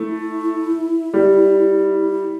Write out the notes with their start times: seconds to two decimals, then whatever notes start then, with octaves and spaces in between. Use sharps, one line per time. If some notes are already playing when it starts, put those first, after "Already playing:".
Already playing: A3 E4
1.14 G3